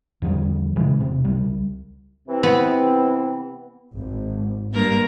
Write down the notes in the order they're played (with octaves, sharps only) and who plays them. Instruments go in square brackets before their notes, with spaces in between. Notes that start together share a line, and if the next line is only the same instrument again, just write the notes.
[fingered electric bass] E2 D3 F3 G3
A#2 C#3 E3 G#3
E1 C3
C#2 G3
[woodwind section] C3 E3 C4
[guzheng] B3
[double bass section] G#1
[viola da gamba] G2 A#3 A#4